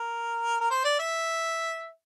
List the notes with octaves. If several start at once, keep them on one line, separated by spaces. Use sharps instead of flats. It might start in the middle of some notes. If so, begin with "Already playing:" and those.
Already playing: A#4
A#4
C5
D5
E5